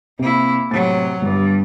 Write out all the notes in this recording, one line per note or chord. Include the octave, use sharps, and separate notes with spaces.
C3 A#3 E4
A2 C3 F#3 A6
G1 G2